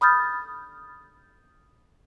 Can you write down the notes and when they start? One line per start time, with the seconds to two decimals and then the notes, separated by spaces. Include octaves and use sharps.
0.01 B5 D#6 F6 G6 A6